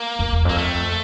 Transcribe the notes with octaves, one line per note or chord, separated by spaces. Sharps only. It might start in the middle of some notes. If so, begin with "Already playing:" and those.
Already playing: A#3
F2
E2
F2 A#3
A3